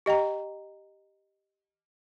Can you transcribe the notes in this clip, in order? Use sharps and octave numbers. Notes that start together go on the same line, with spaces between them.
G4 D#5 G5 A#5